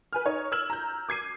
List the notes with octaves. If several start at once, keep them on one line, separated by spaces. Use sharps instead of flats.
B4 G#5 F6
D#4 C#5
E6 F6 G#6 E7 F#7
A#5 G6
D6 G#6 C7 D#7